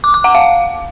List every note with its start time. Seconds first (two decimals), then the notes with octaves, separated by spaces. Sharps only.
0.04 D6
0.14 D6
0.24 F#5
0.35 F5